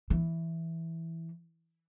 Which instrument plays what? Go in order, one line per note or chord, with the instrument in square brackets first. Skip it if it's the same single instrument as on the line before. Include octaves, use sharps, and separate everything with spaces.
[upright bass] E3